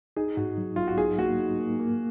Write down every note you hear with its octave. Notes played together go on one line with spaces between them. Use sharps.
D#4 G#4
G#2 F#4
F#3
F#3 F4
F#4
D#4 G#4
A#3 F#4
D#4
A#3
A#3